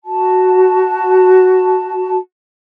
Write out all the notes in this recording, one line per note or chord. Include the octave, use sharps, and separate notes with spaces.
F#4 A5